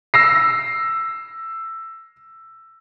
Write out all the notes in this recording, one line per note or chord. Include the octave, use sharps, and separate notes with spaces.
E6 A#6 C7